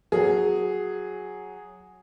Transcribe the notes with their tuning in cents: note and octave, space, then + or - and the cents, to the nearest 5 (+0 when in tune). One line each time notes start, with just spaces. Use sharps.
F#3 +0 G#4 +0